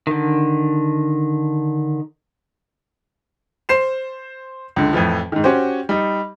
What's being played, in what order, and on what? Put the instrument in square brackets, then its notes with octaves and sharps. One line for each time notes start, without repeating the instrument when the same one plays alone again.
[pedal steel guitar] D3 D#3
[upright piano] C5 C7 E7
C#2 D3
F2 A2 E3 F3
G#2 D#3
C#4 F#4 G4 C5
G3 D#4